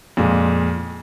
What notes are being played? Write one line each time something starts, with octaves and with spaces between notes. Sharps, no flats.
F2 A#2 G#3